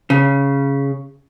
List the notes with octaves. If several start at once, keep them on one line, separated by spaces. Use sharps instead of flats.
C#3